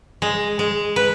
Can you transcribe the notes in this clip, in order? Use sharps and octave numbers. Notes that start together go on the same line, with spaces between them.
G#3
G#3
B4